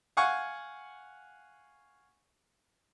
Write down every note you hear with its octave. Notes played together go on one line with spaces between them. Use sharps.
F5 F#5 G#5 C#6